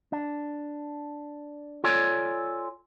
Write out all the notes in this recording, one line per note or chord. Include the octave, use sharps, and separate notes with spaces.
D4
F4 A4 C#5 D5 G#5